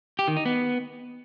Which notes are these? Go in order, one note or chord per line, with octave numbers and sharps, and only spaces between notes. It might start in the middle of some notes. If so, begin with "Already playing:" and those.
G4
D#3
D#4
B3